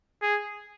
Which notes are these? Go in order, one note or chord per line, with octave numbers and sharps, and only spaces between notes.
G#4